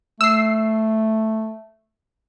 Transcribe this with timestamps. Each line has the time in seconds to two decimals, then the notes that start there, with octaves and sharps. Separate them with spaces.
0.21 A3 E6 C7